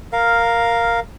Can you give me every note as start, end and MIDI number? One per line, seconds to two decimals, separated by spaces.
0.13 1.00 70
0.13 1.00 77